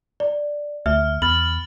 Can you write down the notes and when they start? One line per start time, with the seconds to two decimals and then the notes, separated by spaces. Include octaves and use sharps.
0.20 D5
0.86 D2 E5 F6
1.22 E2 B5 F6 A6 F#7